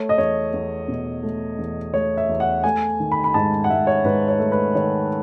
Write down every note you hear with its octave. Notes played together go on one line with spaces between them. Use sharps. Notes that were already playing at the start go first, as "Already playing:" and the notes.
Already playing: A3 C#5
D#5
E2 C#5
E2
B2
A3
E2
A3 C#5
E5
E2
F#5
A3 G#5
D#3
B5
B5
G#2 A5
F#5
G#2 E5
C#5
G#2 B4
C#5
A3
B4
D#3 C#5